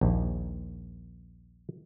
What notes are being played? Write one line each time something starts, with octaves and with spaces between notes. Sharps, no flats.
A#1 D#2